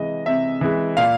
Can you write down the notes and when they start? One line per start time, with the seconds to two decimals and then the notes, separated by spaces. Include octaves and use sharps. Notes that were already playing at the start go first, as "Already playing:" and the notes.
Already playing: C3 E3 G#3 D#5
0.26 C3 E5
0.61 E3 G#3
0.97 A#2 F5